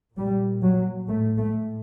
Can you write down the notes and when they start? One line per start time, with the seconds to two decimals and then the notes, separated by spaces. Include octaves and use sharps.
0.16 A#2 G3
0.62 F#3
1.07 A2 A3
1.37 A3